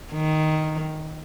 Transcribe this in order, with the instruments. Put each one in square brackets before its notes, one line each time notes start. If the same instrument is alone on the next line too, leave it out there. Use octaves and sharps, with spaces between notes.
[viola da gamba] D#3